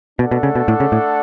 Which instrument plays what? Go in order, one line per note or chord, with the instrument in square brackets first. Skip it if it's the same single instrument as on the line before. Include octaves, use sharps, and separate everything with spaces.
[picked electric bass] B2 [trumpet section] A3 D4 A4 D5 F#5
[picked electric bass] B2
C#3
B2
A2
C#3
A2